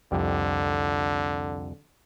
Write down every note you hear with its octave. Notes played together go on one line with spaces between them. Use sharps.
C2 F2 D3 G4